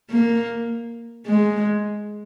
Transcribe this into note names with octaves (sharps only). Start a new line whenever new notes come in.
A#3
G#3